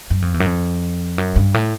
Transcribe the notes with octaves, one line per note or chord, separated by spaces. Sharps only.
F#2
F2
E2
F#2
F2
F#2
G2
A2